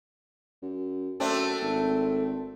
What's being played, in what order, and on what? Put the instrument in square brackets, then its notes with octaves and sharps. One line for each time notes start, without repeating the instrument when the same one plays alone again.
[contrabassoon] F#2
[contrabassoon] F#2 [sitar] A3 C4 D4
[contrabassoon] G#1